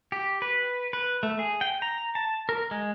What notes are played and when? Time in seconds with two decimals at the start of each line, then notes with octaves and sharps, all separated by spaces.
0.12 G4
0.42 B4
0.93 B4
1.23 A3
1.39 G#4
1.61 G5
1.82 A#5
2.15 A5
2.49 A#4
2.71 G#3